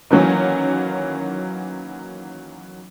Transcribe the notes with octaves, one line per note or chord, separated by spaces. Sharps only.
D#3 E3 F#3 A#3 C#4